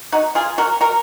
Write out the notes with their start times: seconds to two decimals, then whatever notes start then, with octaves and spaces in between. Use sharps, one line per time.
0.12 D#4 F#4
0.35 F4 G#4
0.58 F#4 A#4
0.81 F#4 A#4